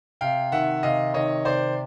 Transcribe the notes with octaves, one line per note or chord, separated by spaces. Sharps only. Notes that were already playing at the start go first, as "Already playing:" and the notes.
C3 F5 G5
D#3 E5 F#5
C3 D#5 F5
D#3 C#5 D#5
C3 C5 D5